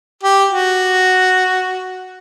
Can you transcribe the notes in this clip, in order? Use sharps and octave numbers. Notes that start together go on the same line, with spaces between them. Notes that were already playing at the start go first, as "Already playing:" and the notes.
G4
F#4